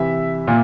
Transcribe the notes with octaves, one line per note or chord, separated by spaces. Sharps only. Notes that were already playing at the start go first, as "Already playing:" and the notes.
Already playing: C3 E3 E5
A#2